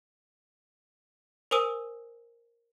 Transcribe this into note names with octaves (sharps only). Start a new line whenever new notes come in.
A#4 C5 G#5 D#6 E6 D#7